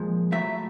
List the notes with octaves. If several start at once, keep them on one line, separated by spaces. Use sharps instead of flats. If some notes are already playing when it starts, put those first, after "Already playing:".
Already playing: A#2 F3 G#3
A2 F#3 A3 E5